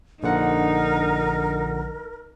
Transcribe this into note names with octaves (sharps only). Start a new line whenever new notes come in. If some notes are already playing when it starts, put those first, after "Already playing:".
A#1 D3 D#4 A#4 F#5